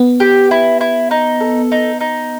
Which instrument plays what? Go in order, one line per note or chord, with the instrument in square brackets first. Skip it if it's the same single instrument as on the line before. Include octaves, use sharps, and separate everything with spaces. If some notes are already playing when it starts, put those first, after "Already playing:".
Already playing: [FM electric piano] B3
[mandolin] G4
E4
E4
D#4
A4
D#4
D#4